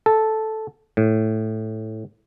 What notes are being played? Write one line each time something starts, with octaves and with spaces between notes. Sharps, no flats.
A4
A2